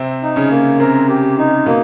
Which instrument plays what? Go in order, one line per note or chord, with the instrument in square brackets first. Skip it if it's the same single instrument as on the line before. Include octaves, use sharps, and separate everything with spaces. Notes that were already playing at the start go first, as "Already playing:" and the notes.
Already playing: [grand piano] C3 C4
[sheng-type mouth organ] D#4
[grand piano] C#3 C#4
[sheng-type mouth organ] A#3
[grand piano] C3 C4 [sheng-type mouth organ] A#4
[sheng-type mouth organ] G4
D#4
[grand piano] B2 B3 [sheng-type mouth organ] A#3